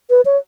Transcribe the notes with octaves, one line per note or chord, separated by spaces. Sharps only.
B4
C#5